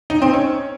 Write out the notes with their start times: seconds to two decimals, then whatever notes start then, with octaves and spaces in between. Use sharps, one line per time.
0.10 D#4
0.22 C4
0.33 C#4